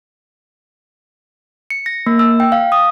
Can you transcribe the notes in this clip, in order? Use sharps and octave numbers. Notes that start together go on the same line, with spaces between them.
C#7
A#6
A#3
E6
G5
F5
D#6